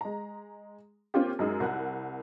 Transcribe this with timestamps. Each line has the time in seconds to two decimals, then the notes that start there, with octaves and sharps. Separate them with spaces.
0.01 G#3 A#5
1.14 A#3 C4 C#4 F4 G4
1.39 F#2 G#3 D#4 E6
1.60 C2 A#4 F#5 F#6